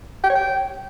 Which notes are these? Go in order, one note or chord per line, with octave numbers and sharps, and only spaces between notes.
G5
C#5
G5